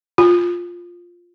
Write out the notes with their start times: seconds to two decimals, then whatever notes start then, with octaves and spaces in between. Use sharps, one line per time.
0.18 F4